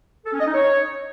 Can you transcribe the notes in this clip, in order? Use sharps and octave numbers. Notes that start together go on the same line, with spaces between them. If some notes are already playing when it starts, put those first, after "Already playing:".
A4
C#4
D#5
D#4
C#5